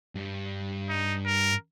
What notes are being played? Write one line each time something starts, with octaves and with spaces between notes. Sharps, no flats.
G2 G3
D#4
A#4